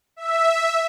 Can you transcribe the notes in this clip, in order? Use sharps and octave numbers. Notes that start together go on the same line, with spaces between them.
E5